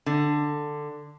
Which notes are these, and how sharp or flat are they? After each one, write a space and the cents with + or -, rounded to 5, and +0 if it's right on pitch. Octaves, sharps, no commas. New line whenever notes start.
D3 +10